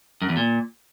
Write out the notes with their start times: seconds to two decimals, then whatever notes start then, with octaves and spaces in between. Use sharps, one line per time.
0.22 F#2
0.29 E2
0.37 A#2